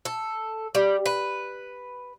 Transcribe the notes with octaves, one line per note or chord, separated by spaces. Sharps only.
A4
G3
B4